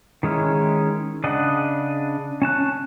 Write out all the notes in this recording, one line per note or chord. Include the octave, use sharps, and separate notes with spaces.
D#3 G#3 C#4 E4
C#3 D4 D#5 F#5
C#4 A5 F#6